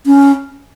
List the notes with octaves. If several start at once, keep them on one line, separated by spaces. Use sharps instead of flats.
C#4